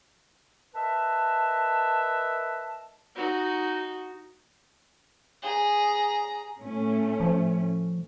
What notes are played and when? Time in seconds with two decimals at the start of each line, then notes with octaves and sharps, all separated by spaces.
0.74 A#4 B4 D#5 E5 A5
3.15 D#4 F#4
5.43 G#4 A#5
6.58 A2 A3 C#4
7.20 F3